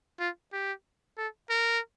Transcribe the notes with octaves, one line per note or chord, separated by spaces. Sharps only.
F4
G4
A4
A#4